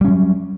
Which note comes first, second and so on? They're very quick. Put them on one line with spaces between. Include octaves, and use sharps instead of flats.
G3 C#4 F#3